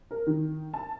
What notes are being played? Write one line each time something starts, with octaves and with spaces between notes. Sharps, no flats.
A#4
D#3
A5